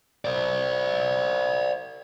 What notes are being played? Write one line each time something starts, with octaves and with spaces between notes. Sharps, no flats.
C5 D5